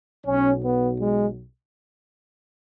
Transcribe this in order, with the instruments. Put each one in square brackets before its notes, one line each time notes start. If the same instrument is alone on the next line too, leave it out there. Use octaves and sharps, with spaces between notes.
[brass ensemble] B1 B2 F#3 C#4
B3
G#3